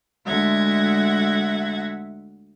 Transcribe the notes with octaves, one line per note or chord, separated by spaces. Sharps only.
D2 G#3 E5 F#5 G#6 A#6